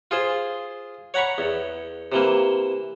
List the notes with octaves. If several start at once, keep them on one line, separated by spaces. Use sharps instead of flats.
F4 G#4 C5
C#5 F#5 A#5 B5 C#6
E2
C3 E3 A#3